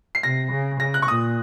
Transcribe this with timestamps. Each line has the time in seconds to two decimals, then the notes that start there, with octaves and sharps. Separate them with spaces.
0.15 C7
0.23 C3 A#6
0.52 C#3
0.80 C#3 A#6
0.94 F#6
1.02 C#6
1.08 A#2 D#6